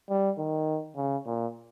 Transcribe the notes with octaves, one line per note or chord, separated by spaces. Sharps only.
G3
D#3
C#3
A#2